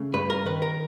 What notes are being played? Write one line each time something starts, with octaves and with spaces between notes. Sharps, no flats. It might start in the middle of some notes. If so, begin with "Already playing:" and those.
Already playing: C#3 A3
G2 B4
A#4
D#3 B4
A#4